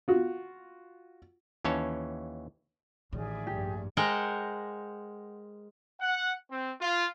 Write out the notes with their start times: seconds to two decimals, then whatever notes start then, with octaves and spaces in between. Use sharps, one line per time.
0.08 F4 F#4
1.64 D#2 E3 C#4 C#5 A5
3.13 A1 A2 D#3 G#4 D5 E5
3.47 A#1 G2 G4
3.97 G#3 A#4 C5 F#5 G5
6.00 F#5
6.51 C4
6.81 F4